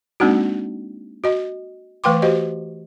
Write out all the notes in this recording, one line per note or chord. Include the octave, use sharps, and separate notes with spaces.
G#3 A#3 C4 D4 D#4 F#4
F#4 D#5
E3 A3 B4 G5 C6 D6
F#4 G4 C5 D#5